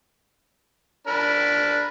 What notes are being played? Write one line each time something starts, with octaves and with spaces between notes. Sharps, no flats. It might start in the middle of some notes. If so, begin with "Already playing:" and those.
D4 A#4 B5